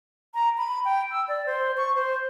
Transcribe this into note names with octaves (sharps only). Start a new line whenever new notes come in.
A#5
B5
G5
E6
D5
C5
C#6
C5